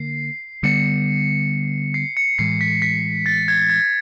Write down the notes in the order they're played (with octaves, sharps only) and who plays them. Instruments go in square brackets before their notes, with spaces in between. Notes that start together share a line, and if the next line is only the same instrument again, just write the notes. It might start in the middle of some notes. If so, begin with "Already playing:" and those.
Already playing: [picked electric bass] D3 A#3 [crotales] C7
[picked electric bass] D3 G3 B3 [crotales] C#7
[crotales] C7
C#7
[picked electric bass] A2 E3 G#3 [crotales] C7
[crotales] B6
B6
A6
G#6
G#6